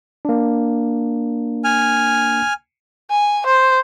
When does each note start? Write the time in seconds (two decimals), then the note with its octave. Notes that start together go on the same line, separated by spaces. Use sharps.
0.25 A#3 D4
1.64 G#5 F6
3.11 G#5
3.47 C5